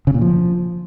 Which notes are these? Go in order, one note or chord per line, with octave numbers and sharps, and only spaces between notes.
C#3
A#2
F3